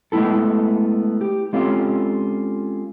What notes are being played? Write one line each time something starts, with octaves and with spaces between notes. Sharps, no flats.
G#3 A3 B3 E4 A4
G4
G#3 C4 C#4 F4 G4 A4